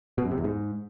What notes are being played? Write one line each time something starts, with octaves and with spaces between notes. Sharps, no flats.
B2
F#2
C3
E2
G#2